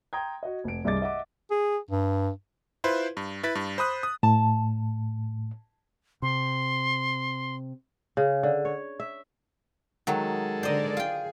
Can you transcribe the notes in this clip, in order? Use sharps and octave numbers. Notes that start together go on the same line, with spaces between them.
G5 A#5 C6 D#6 G#6
F#4 D#5
F1 D7
C2 G2 G#4 D#5 D6 A6
D#5 E5 F#5 D6
G#4
G2
E4 F4 B4 C5
G2
E4 B4 A6 B6
G2
C5 B5 D#6 F#6
D#6
A2 A5
C3 C6
C#3
D3
C#5
E5
D#3 F#3 G#3 A4
D3 A#4 C5 D5 D#5
F4 G#4 G5